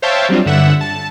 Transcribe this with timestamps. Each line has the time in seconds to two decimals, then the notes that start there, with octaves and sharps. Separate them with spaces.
0.02 C5 C#5 E5 F5 G5 A5
0.29 F#3 G3 C4 D4 F4
0.46 G2 D3 E5 F#5 E7
0.81 A5